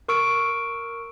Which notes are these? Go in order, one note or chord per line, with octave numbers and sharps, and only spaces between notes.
A#4 C#6 E6 D7